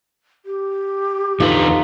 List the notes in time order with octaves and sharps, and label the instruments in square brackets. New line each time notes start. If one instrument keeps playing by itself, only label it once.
[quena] G4
[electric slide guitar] E2 D3 B4 [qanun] D#4 F4 A4